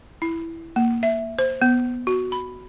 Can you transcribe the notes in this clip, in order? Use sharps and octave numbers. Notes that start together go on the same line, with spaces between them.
E4
A#3
E5
C5
B3
F#4
B5